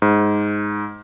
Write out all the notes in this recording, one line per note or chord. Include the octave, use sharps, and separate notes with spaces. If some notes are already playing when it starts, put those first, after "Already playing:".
G#2